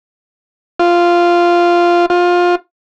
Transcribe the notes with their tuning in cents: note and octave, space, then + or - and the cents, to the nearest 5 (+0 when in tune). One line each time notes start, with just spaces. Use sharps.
F4 -5
F4 +20